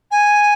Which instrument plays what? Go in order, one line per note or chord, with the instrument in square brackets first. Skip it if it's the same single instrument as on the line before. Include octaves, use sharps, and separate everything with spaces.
[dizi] G#5